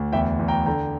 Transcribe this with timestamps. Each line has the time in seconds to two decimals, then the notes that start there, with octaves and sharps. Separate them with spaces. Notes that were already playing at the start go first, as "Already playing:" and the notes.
Already playing: D2
0.13 E2 E5 G5
0.39 E2
0.48 G5 A#5
0.66 D3 G5 A#5